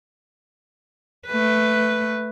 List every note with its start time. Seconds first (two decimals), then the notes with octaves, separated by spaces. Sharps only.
1.27 A3 B4